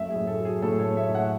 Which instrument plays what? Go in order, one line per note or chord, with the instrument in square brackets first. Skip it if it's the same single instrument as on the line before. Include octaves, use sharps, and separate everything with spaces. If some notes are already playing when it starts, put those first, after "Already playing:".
Already playing: [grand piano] F#2 A3 E5
G#4
A2
A4
F#3
G#4
A2 A4
C#5
A3
E5
A2
F#5